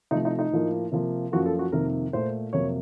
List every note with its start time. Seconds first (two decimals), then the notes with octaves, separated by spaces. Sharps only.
0.11 C3 F3 A3 D#4
0.25 D#4
0.39 D#4
0.51 A2 F3 A#3
0.92 C3 F3 A#3
1.32 F#2 F3 A#3 F#4
1.46 A4
1.59 F#4
1.72 F2 C3 D#3 A#3 A#4
2.13 A#2 A3 C5
2.53 F2 C3 F#3 A#3 C#5